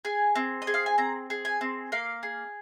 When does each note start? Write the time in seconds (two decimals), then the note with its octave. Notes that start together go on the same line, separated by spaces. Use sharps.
0.05 G#4 G#5
0.35 C4
0.62 D#5
0.67 G#4
0.74 F5
0.86 G#5
0.98 C4 A#5
1.30 G#4
1.45 G#5
1.61 C4
1.92 A#3 F5
2.23 G#4